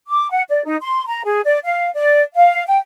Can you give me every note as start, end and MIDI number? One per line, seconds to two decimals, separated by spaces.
0.09 0.29 86
0.31 0.42 78
0.49 0.64 74
0.65 0.77 63
0.82 1.03 84
1.07 1.22 82
1.25 1.40 68
1.45 1.58 74
1.65 1.90 77
1.95 2.22 74
2.36 2.64 77
2.66 2.79 79